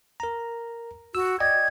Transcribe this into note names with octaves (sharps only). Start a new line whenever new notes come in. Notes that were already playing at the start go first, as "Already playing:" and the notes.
A#4 A#5
F#4 E6
D5 D#5 G5 G#6